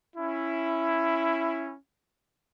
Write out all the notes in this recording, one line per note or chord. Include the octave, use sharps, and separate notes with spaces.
C#4 E4